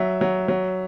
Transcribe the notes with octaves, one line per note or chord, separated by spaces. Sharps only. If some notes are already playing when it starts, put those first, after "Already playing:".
Already playing: F#3 E5
F#3
F#3